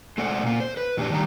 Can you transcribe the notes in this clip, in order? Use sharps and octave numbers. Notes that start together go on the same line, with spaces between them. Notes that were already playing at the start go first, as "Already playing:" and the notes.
G#3 A3 C#4 C5 D5 F#5
A#2 A#3
C5
B4
E2 A#2 D4 G4 D5 A5
D#3 G3 A#5